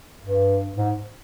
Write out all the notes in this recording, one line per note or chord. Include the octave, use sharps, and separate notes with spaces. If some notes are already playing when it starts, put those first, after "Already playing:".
G2
G#2